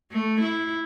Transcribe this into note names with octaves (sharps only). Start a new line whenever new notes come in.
A3
E4